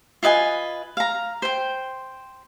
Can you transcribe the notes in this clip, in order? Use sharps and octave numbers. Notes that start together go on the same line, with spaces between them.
F4 B4 D#5 G#5
F5 A#5
C5 G5